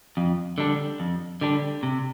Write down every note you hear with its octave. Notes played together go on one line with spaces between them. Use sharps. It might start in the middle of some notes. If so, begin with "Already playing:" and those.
F2
D3 G3 D4
F2
D3 G3 D4
C3